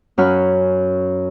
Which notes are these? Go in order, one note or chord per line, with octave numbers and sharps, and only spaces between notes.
F#2 C#4 C#5 F#5 B5 F6